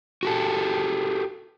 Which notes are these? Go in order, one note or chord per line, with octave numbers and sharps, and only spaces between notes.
F#4 G4 A4